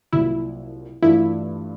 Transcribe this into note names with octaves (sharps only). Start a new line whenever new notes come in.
C2 A#2 F#3 E4
G2 E3 A3 D4 E4 F4